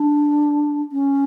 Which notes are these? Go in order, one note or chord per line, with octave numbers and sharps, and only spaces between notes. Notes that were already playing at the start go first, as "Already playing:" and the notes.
Already playing: D4
C#4